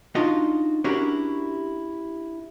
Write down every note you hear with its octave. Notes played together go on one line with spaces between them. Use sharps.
D4 D#4 F4 F#4 D#5
C#4 D4 E4 F#4 G4 A#4